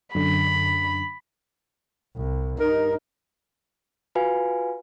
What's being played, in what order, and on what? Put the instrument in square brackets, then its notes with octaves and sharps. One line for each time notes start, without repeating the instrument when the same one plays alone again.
[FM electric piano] F#2 D3 [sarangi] B5
[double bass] C2
[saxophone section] G2 A#4 [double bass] D#4
[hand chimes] F4 F#4 B4 F5 G#5